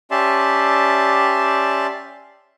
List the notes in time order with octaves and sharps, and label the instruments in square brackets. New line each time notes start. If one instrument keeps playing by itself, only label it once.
[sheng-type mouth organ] C#4 G4 D5 E5 A5 C6